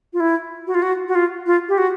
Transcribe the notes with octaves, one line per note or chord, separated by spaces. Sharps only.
F4
E4
F#4
F4
F#4
F#4
F4
F4
G4
F#4